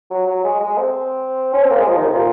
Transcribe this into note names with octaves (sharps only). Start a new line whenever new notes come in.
F#3
F#3
G#3
G#3
C4
C#4
C4
A#3
G#3
F3
D#3
C3
A#2